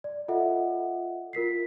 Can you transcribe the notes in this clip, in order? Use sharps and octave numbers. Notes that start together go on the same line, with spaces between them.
D5
F4 A4 D#5 E5 F#5
F4 A#4 B6 C7